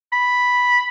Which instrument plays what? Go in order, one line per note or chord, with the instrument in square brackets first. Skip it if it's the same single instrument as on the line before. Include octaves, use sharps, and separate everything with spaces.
[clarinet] B5